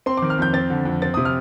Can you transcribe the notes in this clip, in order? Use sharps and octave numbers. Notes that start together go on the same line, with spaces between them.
C4 C6
D#3 D6
F6
F2 G6
C4 A6
D3
F2
C4 A6
C3 D#6
F6